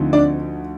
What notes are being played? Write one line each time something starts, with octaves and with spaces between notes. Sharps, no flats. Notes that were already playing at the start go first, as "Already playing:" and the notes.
Already playing: D2 D3 F3 C4 D#4
D4 D5